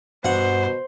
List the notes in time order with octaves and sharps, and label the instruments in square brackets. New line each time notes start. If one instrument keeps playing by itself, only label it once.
[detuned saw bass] G2 [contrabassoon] B2 [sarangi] C5 [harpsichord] F#5